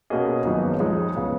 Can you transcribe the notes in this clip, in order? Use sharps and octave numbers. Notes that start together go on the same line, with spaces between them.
B2 A#3 C#4 G#4 D#5
G#1 F#2 F3 B3 D#4
F2 F3 G#3 D#4 G#4
C#3 G#3 B3